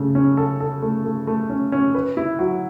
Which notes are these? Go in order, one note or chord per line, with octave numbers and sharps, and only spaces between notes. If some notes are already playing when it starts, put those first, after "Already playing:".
Already playing: C#3 A3
C#4
A4
A4
A3
A3
A3
C#4
C#4
B4
E4
F#3